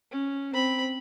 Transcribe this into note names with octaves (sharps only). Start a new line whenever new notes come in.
C#4
C4 B5